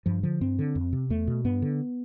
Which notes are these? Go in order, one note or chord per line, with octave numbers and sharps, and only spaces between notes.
G2 F3
D3 F3
G2 C4
D3
F2
C3
E2 A3
B2
G2 B3
D3